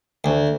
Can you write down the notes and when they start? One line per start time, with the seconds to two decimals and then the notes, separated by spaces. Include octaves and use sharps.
0.24 D2